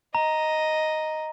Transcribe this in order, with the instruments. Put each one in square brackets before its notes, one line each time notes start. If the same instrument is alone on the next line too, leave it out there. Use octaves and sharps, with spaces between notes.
[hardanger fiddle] D#5 [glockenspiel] A#5